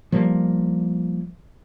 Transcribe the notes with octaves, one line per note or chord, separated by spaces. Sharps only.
F3 G3 A#3